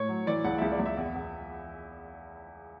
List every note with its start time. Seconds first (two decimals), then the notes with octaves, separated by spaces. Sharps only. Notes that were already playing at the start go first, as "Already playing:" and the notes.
Already playing: A2 C#5
0.09 F#3
0.27 E3 D5
0.44 C#2 F#5
0.58 C#2 E5
0.72 D5
0.80 C#2
0.86 E5
0.97 E2
1.15 E2